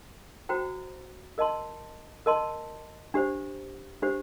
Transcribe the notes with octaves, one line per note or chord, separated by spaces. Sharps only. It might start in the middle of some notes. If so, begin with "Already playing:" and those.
F#4 C5 G5 A#5
A#4 D#5 A5 C6
A#4 D#5 A5 C6
D4 G4 C5
D4 G4 C5